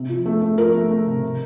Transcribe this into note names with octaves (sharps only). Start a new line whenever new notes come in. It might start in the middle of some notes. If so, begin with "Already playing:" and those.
Already playing: C3
F3
A3
A3
F3 A#4
A3
A3
C3
C3